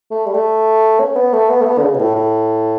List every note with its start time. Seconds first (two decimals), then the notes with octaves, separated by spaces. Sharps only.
0.11 A3
0.26 G3
0.34 A3
0.99 C#4
1.16 B3
1.33 A3
1.49 B3
1.61 A3
1.66 B3
1.78 D3
1.83 C#3
1.94 B2
1.99 A2
2.16 A2